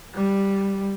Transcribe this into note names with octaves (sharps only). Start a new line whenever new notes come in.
G3